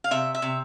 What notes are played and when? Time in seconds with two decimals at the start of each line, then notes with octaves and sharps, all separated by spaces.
0.04 F5
0.11 C3 E5
0.35 E5
0.42 C3